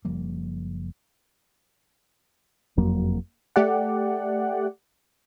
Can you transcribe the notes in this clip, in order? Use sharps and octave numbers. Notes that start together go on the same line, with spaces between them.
F#1 F3 G3 A#3
F#1 F2 F#3 A#3
A3 G4 D5 F#5